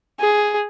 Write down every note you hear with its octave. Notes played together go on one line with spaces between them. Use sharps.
G#4